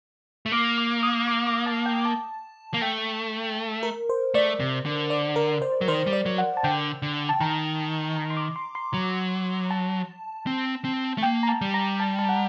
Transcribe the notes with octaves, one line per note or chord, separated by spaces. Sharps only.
A3
A#3 D6
D6
D#6
D6
D6
A5
G5
A5
A#3
A3 G5
A#4
C5
A3 D5
C3
D3
D5
A#4
C5
F#3
D#3 C5
G3
D5
F#3
F#5
A5
D3 G5
D3
A5
D#3 A#5
A#5
C6
D6
C6
C6
F#3
A5
C4
C4
A3
A#3 G5
A#5
A5
G3
A#5
A5
A5
F#5